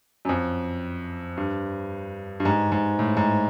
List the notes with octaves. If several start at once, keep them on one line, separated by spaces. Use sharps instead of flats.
F#2
F2
G2
G2
G#2
G#2
A2
G#2